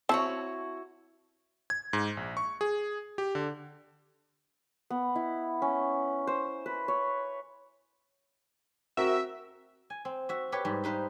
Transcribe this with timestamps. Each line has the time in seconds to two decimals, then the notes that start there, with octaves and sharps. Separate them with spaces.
0.09 C4 E4 F#4 C#5 A5
1.70 G#6
1.93 G#2
2.17 A#1
2.37 C#6
2.61 G#4
3.18 G4
3.35 D3
4.90 B3
5.16 E4
5.62 C#4
6.27 C5
6.66 B4
6.88 C#5
8.97 C4 F#4 A#4 E5
9.90 G#5
10.05 C4
10.29 F#4 E5
10.52 G4 B4 C#5
10.65 G#2 G3
10.84 D#4 B4 C5 F5